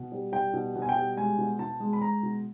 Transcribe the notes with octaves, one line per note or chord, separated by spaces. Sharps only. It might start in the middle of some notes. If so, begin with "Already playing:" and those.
Already playing: B2
G3
G3 G5
B2
B2
G#5
G5
G3
G#3 G#5
B2
B2 A5
G#3
B5
G#3 A#5
B2